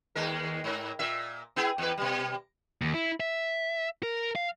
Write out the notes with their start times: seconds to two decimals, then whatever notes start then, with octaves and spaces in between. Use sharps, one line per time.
0.15 D#2 G#3 A#4
0.64 G#2 A#4
0.99 A#2 E5
1.56 B3 E4 G#4
1.78 E2 B4
1.97 B2 G3
2.81 D#2
2.94 E4
3.20 E5
4.03 A#4
4.36 F5